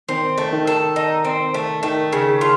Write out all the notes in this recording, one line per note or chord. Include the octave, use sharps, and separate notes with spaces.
D#3 C4
A3
D#3
A4
D#4
C4
A3
D#3 A3
C#3
F4